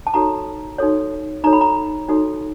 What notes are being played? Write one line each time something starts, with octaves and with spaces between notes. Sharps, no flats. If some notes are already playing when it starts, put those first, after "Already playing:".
A5
D#4 F#4 A4 C#5 A#5
D#4 F#4 A4 C#5
D#4 F#4 A4 C#5 A#5
B5
A#5
D#4 F#4 A4 C#5